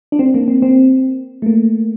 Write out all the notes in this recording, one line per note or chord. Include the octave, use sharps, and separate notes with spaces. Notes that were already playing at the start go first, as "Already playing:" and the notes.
D4
C4
A#3
C4
C4
A3
A#3